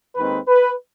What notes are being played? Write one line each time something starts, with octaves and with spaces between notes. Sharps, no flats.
D#2 D#3 G#3 C4 B4
B4